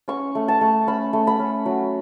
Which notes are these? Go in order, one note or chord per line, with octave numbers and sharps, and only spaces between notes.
C#4 C#6
A3
A5
A3
C#4 B5
A3
B5
C#4
F#3